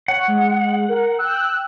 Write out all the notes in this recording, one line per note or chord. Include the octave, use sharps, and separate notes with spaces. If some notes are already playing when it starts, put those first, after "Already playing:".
C#5 F#5
G#3
A#4
G5 E6 F#6